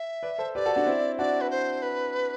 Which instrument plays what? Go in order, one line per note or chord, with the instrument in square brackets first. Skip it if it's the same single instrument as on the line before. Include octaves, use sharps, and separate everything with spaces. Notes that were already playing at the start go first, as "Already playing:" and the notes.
Already playing: [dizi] E5
[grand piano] B4 D5
A4 C5
[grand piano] G4 B4 [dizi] D5
[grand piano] F#4 A4
D4 F#4
C4 E4
[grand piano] D4 F#4 [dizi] D5
[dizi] B4
C5
B4